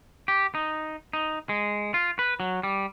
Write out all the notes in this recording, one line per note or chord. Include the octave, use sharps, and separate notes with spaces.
G4
D#4
D#4
G#3
F4
B4
F#3
G3